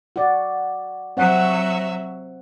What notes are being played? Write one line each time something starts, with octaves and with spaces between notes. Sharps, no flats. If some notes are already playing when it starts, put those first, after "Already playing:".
F#4 D5
F#3 C4 F#4 C#5 E5 F#5